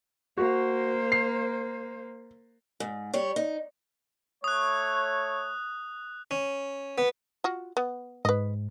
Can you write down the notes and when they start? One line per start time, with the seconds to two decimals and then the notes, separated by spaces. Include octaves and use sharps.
0.38 A#3 F#4 C5
1.12 C7
2.80 G#2
3.13 G3 C#5
3.36 D#4
4.44 A3 C#5 D#6 F#6
6.31 C#4
6.98 B3
7.44 F4 F#4
7.77 B3
8.25 G#2 B4 D#5